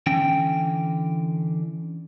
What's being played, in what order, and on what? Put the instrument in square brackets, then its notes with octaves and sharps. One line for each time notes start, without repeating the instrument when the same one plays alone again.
[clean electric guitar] D3 E3 C#4 G5